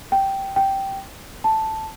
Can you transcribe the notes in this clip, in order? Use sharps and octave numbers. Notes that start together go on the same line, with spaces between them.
G5
G5
A5